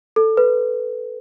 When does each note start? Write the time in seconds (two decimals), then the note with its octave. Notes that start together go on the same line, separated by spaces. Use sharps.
0.16 A4
0.37 B4